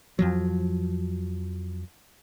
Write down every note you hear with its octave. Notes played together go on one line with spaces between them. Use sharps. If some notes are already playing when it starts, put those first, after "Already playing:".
F2 F3 F#3